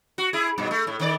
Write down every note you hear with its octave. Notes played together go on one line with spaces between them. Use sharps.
F#4
E4 G#4
G2 B2
A3
A2
D#3 C#4 D5